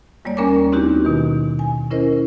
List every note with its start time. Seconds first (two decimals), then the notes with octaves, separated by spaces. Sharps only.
0.25 F2 G3 A3 A#3 C#5 D5
0.37 D#2 A#3 C#4 A#4 G#5 D6
0.72 C4 D#4 E4 F#4 G4
1.05 B2 D#3
1.59 G#5
1.90 C#4 E4 A#4 C5 D#5